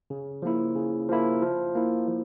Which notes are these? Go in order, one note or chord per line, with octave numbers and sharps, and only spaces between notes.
C#3
F3 A#3 E4
C#3
F3 A#3 E4
F3
A#3 E4
F3